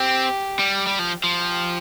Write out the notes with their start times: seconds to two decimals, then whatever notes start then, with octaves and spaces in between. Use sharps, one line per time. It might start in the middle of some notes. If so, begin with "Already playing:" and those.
Already playing: C4 G4
0.59 G3
0.87 G3
0.99 F3
1.24 F3
1.41 G4